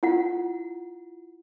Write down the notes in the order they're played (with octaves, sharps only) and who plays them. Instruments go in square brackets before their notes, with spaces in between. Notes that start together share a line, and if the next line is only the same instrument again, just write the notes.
[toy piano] E4 F4 F#5